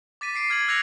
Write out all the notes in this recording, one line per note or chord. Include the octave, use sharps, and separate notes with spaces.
D6 A6 B6 D#7
D6 C7 D7
F6 G#6 C7 F#7
E6 F#6 G#6 A#6 C#7 F7